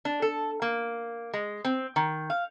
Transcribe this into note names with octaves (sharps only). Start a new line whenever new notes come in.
D4
A4
A#3
G#3
C4
D#3
F5